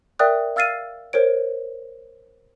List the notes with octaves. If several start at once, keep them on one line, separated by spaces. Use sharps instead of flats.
A#4 D5 E5 G5 D#6 F#6
F5 E6 F6 A6 C7 D#7
A#4 C5 C#5 D7